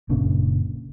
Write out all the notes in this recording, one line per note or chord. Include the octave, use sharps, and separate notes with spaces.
F#1 A#2 C#3 D4